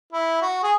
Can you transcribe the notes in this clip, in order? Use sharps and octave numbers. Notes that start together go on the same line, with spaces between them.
E4
F#4
G#4